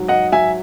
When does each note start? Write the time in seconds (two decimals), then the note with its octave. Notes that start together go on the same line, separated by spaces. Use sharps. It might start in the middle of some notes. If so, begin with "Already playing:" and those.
Already playing: G#2 F#3
0.08 D#5 F#5
0.32 F#3 E5 G#5